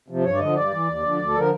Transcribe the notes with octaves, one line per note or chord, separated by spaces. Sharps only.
C3 F3
G2 C#5
D5
D3 F3 D#5
G2 D5
E3
D#2
D3 F3
D2
A4
D3 F3 A#4